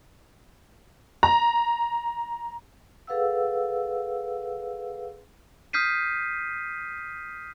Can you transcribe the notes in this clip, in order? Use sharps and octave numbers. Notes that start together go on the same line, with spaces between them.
A#5
G#4 A4 B4 F5 F#5 E6
D#6 F6 G6 B6 C7 D#7